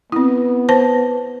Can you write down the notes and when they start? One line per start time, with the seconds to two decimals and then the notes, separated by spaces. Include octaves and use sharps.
0.12 B3 C4 E4
0.69 B4 C5 A5